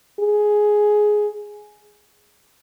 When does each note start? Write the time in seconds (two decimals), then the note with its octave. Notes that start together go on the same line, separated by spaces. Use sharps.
0.20 G#4